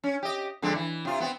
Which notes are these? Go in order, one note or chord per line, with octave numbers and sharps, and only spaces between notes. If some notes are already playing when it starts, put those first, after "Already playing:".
C#4
G4 D#5
F2 D3 G#3
E3
C3 F4
B3 C4